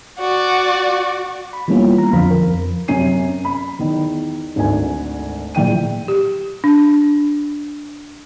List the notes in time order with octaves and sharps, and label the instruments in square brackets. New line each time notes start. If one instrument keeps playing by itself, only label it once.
[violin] F#4 D5
[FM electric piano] B5
E3 G3 A#3 B3 C#4 F4
A#5
F2 D3 F3 C5 F5 B5
A#4
F2
[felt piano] F#2 C3 C#4 G#5 C7 D#7
B5
E2 D#3
G#1 D2 G#2 G#5
A#1 E3 G5 D#7
[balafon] G4
D4